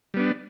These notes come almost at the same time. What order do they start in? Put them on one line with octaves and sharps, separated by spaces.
G3 B3 D4